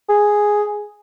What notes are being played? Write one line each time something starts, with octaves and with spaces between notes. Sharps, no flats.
G#4